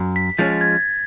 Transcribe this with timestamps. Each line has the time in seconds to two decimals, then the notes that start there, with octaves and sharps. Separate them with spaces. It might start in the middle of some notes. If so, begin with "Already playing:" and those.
Already playing: F#2
0.16 B6
0.38 F3 G#3 C#4 A6
0.61 G#6